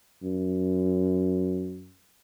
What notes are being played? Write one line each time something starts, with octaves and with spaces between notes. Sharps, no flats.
F#2